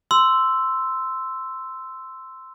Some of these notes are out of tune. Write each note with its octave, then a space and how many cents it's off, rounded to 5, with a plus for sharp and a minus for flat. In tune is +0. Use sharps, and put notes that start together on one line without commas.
C6 -10 E6 +0